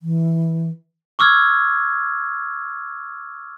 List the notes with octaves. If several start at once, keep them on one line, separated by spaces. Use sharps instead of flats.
E3
C#6 D6 E6 F6 G#6